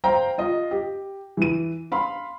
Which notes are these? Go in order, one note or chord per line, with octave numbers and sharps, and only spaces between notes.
C5 F5 G5 A#5
F4 D#5
G4
E3 D#7
F5 B5 C6